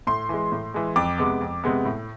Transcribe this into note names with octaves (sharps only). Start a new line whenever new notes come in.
A2 C6
E3 G#3
A2
E3 G#3
F2 D6
C3 G#3 B3
F2
C3 G#3 B3
A2